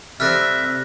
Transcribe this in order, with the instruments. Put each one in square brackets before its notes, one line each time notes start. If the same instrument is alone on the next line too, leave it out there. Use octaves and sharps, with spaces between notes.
[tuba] C3 [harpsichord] G3 A3 C4 [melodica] E5 [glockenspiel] F6 F#6 A#6